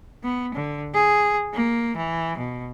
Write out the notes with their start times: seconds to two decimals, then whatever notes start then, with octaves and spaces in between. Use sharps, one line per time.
0.23 B3
0.54 D3
0.94 G#4
1.54 A#3
1.96 E3
2.38 B2